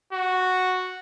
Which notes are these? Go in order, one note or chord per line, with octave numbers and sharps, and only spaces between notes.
F#4